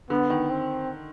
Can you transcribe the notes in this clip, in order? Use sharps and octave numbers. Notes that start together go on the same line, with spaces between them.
D3 B3
D#3
C4